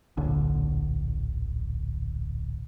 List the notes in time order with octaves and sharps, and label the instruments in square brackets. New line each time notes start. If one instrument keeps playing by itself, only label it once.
[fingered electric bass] D1 A#1 D3